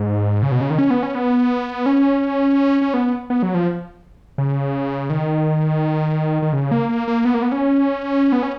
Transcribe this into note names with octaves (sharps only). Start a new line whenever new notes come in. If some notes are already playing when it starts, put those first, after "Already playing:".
Already playing: G#2
C#3
B2
C#3
D#3
C#4
B3
C#4
B3
C#4
C#4
B3
B3
F#3
F3
C#3
D#3
D#3
C#3
A#3
A#3
A#3
B3
A#3
B3
C#4
B3
C#4